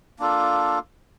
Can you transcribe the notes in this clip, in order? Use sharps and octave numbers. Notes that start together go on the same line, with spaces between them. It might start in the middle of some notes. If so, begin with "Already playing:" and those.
A#3 D4 F4 A4